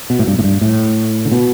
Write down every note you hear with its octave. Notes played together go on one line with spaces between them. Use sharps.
B2
A2
G2
A2
G2
A2
D3
B2